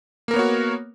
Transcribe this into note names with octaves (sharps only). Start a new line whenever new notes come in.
A#3 B3 F#4 A#4 C#5